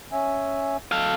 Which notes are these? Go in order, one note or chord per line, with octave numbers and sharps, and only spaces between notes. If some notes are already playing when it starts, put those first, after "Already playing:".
C#4 E5 G#5
A4 F5